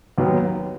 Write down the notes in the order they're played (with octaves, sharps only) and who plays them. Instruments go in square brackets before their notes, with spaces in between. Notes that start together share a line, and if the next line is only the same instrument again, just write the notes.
[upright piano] D#2 D#3 F#3 B3